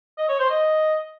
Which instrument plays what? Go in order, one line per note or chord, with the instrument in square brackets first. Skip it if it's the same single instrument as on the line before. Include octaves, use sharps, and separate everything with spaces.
[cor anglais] D#5
C#5
C5
D#5